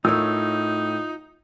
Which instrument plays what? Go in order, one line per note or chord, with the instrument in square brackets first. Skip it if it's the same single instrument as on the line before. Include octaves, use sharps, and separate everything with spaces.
[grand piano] A2 [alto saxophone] D#4 [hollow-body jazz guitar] F4 A#4 C#5 [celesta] E6